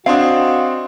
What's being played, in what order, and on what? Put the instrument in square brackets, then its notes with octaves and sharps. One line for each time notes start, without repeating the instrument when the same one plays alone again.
[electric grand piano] C4 D4 [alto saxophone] F#4 [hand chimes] D#5 C6 D#6 [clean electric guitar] F5